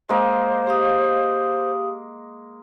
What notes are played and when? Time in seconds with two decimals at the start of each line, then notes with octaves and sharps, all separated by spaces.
0.09 G#3 A#3 C5 D#5
0.67 G4 F5 D#6